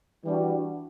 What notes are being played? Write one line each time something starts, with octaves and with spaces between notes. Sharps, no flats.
E3 G3 D4 F#4